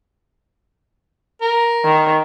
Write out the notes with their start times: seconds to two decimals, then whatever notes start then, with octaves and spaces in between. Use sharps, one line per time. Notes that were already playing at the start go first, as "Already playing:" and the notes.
1.42 A#4
1.84 D#3